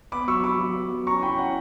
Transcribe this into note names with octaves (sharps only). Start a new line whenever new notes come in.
B3 B5 D6
F#3 C#6 E6
F#3 B5 D6
F#3
B3
F#3
C#4 A#5 C#6
E4 G5 B5
C#4 F#5 A#5